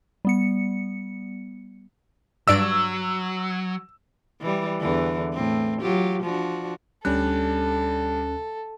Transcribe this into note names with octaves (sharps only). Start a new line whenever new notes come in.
G3 B3 C#7
G2 F#3 D5 E6 D7
E3 G3
E2 D3 E3
A2 C4
F#3 F4 G4
F3 D4 F#4
D2 G3 C#4 D4 A4 F#6